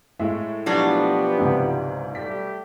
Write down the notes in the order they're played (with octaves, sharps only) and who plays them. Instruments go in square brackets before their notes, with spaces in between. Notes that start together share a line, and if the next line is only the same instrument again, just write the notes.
[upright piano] A2 G#3 E5
[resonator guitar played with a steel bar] B2 F#3 D4 [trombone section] F3 B3 [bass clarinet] G4
[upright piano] C#2 G#2 C3
[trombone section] G3 A3 G4 [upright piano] B6